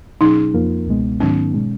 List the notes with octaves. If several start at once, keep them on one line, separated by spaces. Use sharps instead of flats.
B2 F#3 C#4 D#4 G#4
F2 F3 A#3 F4 A#4
C#2 B2 G#3 B3
G#2 D#3 F#3 B3 C#4 D#4
B2 G#3 C#4